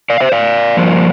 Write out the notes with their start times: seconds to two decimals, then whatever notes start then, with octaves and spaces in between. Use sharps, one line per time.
0.10 D5 F5
0.20 C5 E5
0.32 D5 F5
0.77 G2 F3 A#3